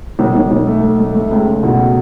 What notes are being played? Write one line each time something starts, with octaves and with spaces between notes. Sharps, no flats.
B1
B1
B1
A3
A3
A3
A3
C#2
C#2
B2